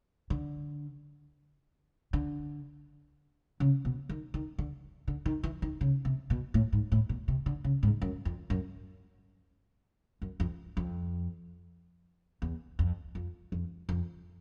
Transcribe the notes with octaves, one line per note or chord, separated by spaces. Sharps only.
D3
D3
C#3
B2
D#3
D#3
D3
D3
D#3
E3
D#3
C#3
C3
B2
A2
G#2
A2
B2
C3
D3
C#3
G#2
F#2
F2
F#2
F#2
F2
F2
E2
F2
F2
F2
F2